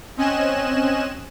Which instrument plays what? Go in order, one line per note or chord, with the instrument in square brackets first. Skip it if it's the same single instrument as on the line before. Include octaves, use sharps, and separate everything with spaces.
[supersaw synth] C4 C#4 D#5 G#5 F#6 E7